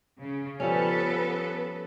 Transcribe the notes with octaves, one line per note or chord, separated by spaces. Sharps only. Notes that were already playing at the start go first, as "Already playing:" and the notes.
C#3
F3 G3 B3 C#4 A4 B4